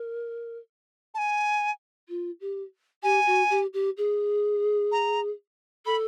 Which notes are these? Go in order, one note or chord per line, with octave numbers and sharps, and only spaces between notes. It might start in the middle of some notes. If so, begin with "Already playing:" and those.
Already playing: A#4
A5
G#5
F4
G4
G4 G#5
F#4
G4
G4
G#4
A#5
A4 B5